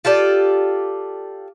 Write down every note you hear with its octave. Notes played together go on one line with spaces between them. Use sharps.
F4 G4 A4 D5